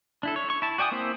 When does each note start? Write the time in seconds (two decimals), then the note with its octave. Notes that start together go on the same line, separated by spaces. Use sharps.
0.23 D4 E4 A4
0.36 C#5
0.50 C#6
0.62 E4 A5
0.78 F#4 D5 G5 G#5 D#6
0.92 A#3 C4 E4 C5 E5